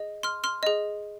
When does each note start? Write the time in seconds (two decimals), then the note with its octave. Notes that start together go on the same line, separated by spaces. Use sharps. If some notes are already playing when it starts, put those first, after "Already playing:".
Already playing: G#4 D#5
0.23 C6 F6
0.44 C6 F6
0.63 G#4 D#5